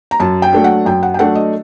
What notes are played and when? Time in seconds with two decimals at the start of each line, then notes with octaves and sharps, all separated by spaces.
0.11 A#5
0.20 F#2 A5
0.42 G5
0.53 F#3 A3 D4
0.64 F#5
0.85 F#2 G5
1.03 F#5
1.14 G5
1.18 F#3 A3 D4 F#5
1.35 D#5